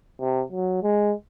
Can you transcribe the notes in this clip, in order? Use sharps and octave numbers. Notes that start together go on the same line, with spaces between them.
C3
F#3
G#3